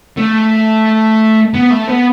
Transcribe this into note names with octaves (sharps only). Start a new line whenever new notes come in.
A3
B3
A3
B3